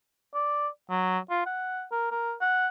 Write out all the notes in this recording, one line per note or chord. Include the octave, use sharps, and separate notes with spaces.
D5
F#3
F4
F#5
A#4
A#4
F#5